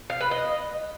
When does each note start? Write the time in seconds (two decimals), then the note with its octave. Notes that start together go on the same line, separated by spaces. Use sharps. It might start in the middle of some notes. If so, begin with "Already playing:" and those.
0.10 F5
0.20 B4
0.31 D#5